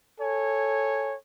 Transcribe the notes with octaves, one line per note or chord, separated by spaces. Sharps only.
A4 C#5 G#5